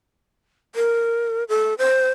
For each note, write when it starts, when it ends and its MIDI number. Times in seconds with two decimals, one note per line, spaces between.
0.75 1.44 70
1.49 1.74 69
1.78 2.10 72